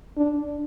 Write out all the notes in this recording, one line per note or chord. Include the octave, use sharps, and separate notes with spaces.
D4